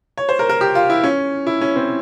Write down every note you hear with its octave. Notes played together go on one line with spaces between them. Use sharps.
C#5
C5
A#4
A#4
G4
F4
E4
C#4
E4
C#4
C4